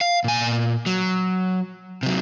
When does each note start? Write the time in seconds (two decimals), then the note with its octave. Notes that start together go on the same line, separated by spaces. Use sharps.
0.01 F5
0.24 A#2 G#5
0.86 F#3
2.03 C3 F#3